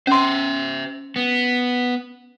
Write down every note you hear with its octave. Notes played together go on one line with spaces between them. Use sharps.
C#4 C5 E5 C6
B3